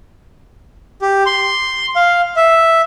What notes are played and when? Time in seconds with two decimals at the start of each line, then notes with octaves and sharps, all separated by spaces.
1.02 G4
1.26 C6
1.96 F5
2.36 E5